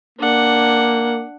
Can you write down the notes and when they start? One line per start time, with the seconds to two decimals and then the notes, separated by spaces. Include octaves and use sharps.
0.19 A#3 D4 F#5